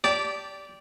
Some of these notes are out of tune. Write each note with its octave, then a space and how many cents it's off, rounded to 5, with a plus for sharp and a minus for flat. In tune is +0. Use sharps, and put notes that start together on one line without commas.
G4 +0 D5 -15 A5 +0